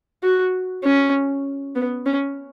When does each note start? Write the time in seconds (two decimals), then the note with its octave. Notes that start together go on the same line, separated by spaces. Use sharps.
0.23 F#4
0.84 C#4
1.76 B3
2.06 C#4